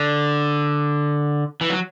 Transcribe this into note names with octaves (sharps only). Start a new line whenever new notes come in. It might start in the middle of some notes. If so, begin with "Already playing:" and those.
Already playing: D3
E3
F#3